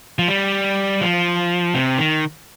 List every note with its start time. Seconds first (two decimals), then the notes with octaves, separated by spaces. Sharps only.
0.19 F3
0.28 G3
1.01 F3
1.74 C3
1.98 D#3